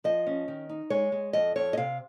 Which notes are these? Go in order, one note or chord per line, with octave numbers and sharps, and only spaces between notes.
F3 D#5
C#4
D#3
D#4
G#3 C#5
G#3
F2 D#5
F2 C#5
D#5
C3 F5